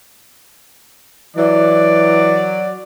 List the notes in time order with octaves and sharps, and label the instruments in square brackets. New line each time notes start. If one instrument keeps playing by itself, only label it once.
[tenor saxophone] E3 [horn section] F#3 D5